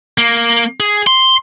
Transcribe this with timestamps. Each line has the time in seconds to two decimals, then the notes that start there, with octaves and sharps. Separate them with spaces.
0.18 A#3
0.80 G#4
1.07 C6